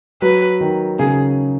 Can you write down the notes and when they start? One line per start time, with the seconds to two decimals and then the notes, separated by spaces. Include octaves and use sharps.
0.22 F#3 B4
0.61 D#3
0.99 C#3 G#4